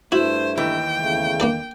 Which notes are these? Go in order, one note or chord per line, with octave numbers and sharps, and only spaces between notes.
G2 A3 E4 F#4 C5
D#2 E3 G5
E2 C#3 A3
A#3 D4 A4